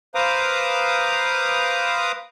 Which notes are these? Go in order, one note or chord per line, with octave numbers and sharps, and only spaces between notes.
B4 C5 F5 A#5 D6 D#6